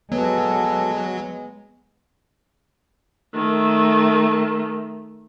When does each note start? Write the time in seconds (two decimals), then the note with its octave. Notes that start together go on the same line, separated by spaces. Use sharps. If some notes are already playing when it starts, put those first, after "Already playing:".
0.12 F#3 G#3 B3 A4
3.34 D#3 A3